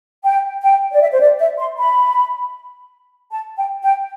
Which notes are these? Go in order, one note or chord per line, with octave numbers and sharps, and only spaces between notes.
G5
G5
D5
E5
C5
D5
E5
C6
B5
A5
G5
G5